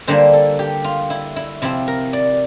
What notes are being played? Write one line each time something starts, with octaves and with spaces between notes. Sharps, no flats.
D3 G3 A#3 D4 C5
A4
G4
F4
E4
E4
C3 F3 C4 E4
A#4
D5